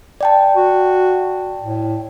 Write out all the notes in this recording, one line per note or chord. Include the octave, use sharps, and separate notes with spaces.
D5 G5 A5
F#4
A2